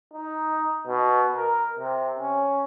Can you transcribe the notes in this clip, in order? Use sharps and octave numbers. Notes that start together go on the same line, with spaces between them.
D#4
B2
A#4
C3
C#4